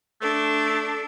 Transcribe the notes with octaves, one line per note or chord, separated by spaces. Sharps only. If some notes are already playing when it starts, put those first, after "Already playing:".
A3 D4 A4